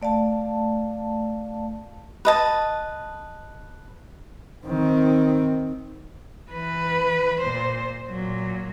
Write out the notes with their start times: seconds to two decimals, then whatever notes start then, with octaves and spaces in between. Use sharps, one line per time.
0.02 A3 D5 F5 A5
2.25 B4 D#5 A5
4.66 D#3 C4
6.51 E3 B4
7.41 A#2 C5
8.09 A#2 F#3